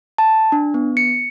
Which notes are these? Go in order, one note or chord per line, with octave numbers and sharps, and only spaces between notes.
A5
D4
B3
C#7